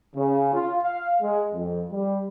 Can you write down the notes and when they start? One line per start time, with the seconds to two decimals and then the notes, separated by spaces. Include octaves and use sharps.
0.16 C#3
0.54 F4
0.83 F5
1.22 G#3
1.54 F2
1.92 G3